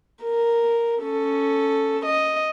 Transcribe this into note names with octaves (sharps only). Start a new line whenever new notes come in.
A#4
C#4 A4
D#5